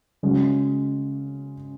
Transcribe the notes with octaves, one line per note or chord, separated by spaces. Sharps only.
C#3 G#3 C#4 F#4